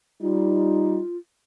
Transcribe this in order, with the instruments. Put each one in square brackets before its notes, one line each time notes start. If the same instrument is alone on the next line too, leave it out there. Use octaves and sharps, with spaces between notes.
[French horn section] G3 D#4 [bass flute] F4